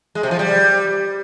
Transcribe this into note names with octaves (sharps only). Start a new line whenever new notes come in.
G#3
C3
F3
G3